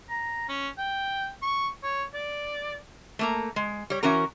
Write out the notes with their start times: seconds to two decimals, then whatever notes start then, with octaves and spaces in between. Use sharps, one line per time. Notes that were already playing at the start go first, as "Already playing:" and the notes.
0.09 A#5
0.49 C#4
0.78 G5
1.42 C#6
1.83 C#5
2.14 D5
3.19 A3 A#3 A#5
3.56 G#3
3.90 G3 C#5
4.03 E3 C#4 F#4 A#4 A#5